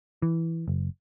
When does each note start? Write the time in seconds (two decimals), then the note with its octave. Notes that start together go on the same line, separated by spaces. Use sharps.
0.22 E3
0.68 F#1